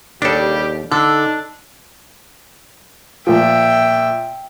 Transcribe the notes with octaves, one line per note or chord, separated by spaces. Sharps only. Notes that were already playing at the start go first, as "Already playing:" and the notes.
D#2 C#3 G3 D4 G4 A4
D3 D4 D#4 A4
A#2 F3 E5 G5